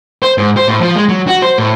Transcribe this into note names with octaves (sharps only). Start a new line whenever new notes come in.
C5
G#2
C5
A2
F3
G#3
F#3
F#4
C5
A2